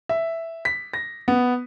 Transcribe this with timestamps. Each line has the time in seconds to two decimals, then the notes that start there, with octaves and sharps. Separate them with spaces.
0.09 E5
0.65 B6
0.94 A#6
1.28 B3